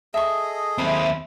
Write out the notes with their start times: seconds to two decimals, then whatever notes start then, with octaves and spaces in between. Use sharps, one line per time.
0.14 G#4 A4 D#5 E5 C#6
0.78 D#2 C4 E5 B5 C6